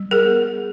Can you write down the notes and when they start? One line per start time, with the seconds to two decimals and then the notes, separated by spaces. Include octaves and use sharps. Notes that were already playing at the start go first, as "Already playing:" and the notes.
Already playing: G3
0.11 G#4 A#4
0.25 B3